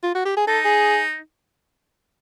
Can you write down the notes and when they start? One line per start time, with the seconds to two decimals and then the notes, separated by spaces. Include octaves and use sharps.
0.03 F4
0.15 F#4
0.25 G4
0.37 G#4
0.47 D#4 A4
0.65 G#4